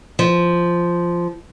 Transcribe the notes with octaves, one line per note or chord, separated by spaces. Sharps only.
F3